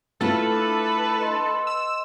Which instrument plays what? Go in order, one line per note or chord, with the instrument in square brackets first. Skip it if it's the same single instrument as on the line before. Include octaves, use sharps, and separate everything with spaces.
[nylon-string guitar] A3 E4 F4 [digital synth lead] A4 [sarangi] B4
[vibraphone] D4
D#5 C6
[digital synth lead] E6